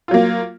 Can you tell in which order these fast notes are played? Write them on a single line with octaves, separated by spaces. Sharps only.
F4 F#3 A#3